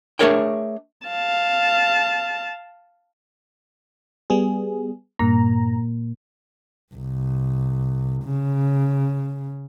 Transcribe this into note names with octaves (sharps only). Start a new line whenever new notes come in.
A3 D4 G#4 A#4 C#5 G5
F5 A5
G3 B3 G#4
G2 A#2 A#3 A#5
C2
C#3